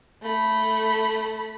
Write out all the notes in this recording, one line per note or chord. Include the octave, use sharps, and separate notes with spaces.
A3 B5